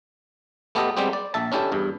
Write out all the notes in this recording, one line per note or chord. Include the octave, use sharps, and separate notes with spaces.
A3 B3 G4 A4 D#5
G3 G#3 B3 C4 G4
D5
A#1 E5 A5
C#4 D4 E4 G4 A4
E2 G2